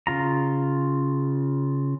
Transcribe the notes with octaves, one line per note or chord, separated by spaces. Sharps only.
C#3 F4 A#5